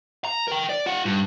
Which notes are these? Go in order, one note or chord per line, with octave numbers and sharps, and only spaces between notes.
A#5
A#4 G5
D5
F4 F#5
G2